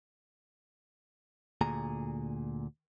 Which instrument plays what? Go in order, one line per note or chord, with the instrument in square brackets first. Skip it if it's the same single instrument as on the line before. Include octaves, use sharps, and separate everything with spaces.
[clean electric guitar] D2 A#2 G#4 A#5